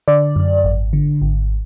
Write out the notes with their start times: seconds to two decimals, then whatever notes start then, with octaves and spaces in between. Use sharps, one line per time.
0.08 D3 D5
0.36 F#2
0.64 G#1
0.93 D3
1.22 G#1